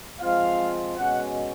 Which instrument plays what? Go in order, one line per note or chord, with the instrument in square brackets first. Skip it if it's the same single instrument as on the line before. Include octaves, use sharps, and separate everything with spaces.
[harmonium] F3 G#3 C4 F4 [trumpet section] F5
[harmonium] B2 G#3 C#4 F#4 [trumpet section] F#5